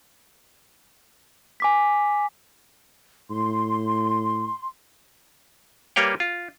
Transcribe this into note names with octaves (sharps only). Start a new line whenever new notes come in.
G#5 D6 B6
A2 C6
G3 A#3 B4 C#5 F5 G5
F4